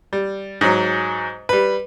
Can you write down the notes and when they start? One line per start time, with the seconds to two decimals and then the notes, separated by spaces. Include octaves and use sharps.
0.13 G3
0.61 G#2 F#3
1.49 G3 B4